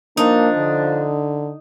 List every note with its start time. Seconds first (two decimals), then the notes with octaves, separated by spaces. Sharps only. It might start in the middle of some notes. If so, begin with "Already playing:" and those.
0.17 F3 A#3 D4 D#4
0.56 D3